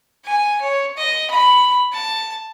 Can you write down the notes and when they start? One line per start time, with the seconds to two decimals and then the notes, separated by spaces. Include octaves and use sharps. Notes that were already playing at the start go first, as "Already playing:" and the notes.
0.24 G#5
0.61 C#5
0.97 D#5
1.30 B5
1.92 A5